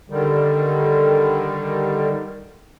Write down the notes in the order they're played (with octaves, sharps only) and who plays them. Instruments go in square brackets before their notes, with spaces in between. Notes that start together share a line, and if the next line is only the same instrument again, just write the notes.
[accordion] D3 D#3 G3